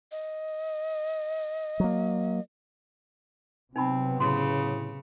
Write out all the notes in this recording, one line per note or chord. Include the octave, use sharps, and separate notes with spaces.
D#5
F#3 A#3
C3 F#3 B3 C4 D#4 A5 B5
A2 C#3 C6